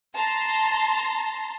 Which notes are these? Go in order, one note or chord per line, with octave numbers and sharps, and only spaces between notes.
A5 A#5 C6